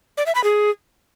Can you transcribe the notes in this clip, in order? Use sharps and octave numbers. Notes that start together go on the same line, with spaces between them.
D5
E5
B5
G#4